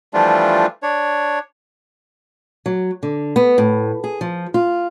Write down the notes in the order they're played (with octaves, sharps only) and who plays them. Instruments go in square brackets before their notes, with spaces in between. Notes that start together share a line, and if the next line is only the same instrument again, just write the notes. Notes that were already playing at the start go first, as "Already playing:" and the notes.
[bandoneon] E3 F3 G3 A3 D4 F4
D4 C#5
[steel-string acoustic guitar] F#3
D3
B3
A2
G#4
F3
F4